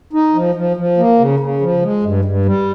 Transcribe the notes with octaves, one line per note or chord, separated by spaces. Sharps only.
D#4
F3
F3
F3
A#3
C#3
C#3
F3
G#3
G2
G2
G3